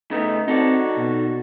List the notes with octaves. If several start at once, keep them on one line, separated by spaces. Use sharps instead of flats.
C#3 A3 B3 D#4
C4 D#4 F#4 A4 D5
B2